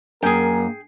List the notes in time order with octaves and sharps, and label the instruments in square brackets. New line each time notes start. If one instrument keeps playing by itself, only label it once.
[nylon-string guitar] F#2 [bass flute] A#3 [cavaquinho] G#4 G5 [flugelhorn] A#4